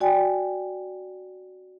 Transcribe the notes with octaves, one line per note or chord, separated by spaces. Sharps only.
F#4 D5 G5 G#5